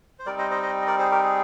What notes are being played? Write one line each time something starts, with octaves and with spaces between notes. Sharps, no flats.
C5
G3 C4 D#4 A#4 D5
C5 D#5
C5 D#5
C5 D#5
D#5
A#4 D5
G#4 C5
G4 A#4
G#4